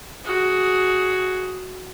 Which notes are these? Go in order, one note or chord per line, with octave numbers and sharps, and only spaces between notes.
F#4 G#4